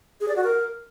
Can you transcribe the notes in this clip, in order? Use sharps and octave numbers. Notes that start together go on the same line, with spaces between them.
G#4
D5
F#4
A#4